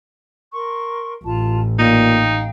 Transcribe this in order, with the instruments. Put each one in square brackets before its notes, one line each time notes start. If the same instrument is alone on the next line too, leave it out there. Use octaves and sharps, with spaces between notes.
[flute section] A#4 C6 C#6
[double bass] A1 [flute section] F4 A5
[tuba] A#2 [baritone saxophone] D#4 [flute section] F5 G5